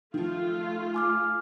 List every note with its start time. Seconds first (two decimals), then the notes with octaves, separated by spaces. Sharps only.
0.14 D#3 F3 A3 F4
0.94 G#5 D6 F6